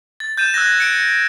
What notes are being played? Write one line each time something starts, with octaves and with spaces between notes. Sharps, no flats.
A6
G6 A6 D#7 E7
E6 F#6 G#6 A#6
C#7 D7